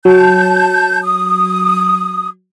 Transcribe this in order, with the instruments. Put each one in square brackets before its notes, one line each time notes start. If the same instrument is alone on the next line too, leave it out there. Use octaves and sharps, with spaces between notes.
[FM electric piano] F#3 [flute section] A5 G6
[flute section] D#6